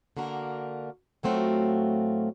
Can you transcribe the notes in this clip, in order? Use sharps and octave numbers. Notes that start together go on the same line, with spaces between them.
D3 A#3 F#4 A#4
A2 F#3 A3 C4 F4 F#4